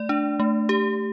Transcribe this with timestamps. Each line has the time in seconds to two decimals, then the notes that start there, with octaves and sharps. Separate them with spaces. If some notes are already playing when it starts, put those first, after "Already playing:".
Already playing: A3 D5
0.09 D4
0.40 A3
0.69 G4